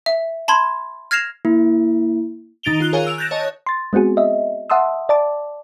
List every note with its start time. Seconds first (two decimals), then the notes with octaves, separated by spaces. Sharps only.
0.06 E5
0.48 A5 B5 C6 G#6
1.11 F6 G#6 A#6 C7 E7 F7
1.45 A#3 E4
2.63 D#3 D#4 A6 D7 F7 G7
2.80 F4 F#6 G7
2.93 G#4 A#4 C#5 F5 G#5
3.07 E6 D7 F7
3.18 F#6 G6 A6 A#6 E7
3.31 C#5 D#5 A5
3.66 C6 A6
3.93 G#3 B3 C4 F#4 G#4
4.17 D#5 E5
4.70 E5 F#5 A5 C6 D#6 E6
5.09 D5 A5 D6